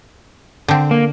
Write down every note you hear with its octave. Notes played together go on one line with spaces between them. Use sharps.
D3 C4
A#3